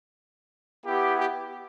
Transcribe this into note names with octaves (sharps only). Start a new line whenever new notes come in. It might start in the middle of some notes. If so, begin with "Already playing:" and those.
B3 E4 G4
G4